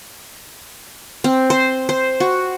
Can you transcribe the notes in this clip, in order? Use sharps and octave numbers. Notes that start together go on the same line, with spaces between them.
C4
C5
C5
F#4